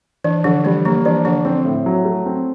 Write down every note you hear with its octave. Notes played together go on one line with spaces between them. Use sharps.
E3 D4
D3 F3
E3 G3
F3 A#3
E3 D4
D3 F3
F3 C4
A2
F#3
A3
C4